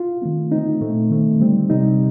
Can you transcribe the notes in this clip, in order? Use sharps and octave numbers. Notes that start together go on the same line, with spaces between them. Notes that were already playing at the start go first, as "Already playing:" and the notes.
Already playing: F4
D#3 A3 C4
D3 A3 C4 D#4
A#2 A3 C4
D#3 A3 C4
D3 G3 C4
C3 G3 C4 D#4